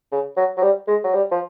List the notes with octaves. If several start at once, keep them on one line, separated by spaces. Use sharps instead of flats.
C#3
F#3
F#3
G3
G#3
F#3
G3
F3